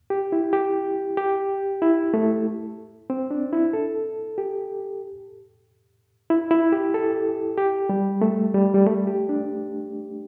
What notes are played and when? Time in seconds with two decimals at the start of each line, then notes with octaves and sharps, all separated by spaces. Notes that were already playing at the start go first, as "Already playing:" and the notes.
0.10 G4
0.32 E4
0.53 G4
1.17 G4
1.82 E4
2.14 A3
3.10 C4
3.31 D4
3.53 E4
3.73 A4
4.38 G4
6.30 E4
6.51 E4
6.72 G4
6.94 A4
7.58 G4
7.89 G3
8.21 A3
8.54 G3
8.74 G3
8.86 A3
9.07 G4
9.29 D4